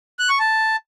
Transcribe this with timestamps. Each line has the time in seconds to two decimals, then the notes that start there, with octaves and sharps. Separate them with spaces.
0.19 F#6
0.29 C#6
0.39 A5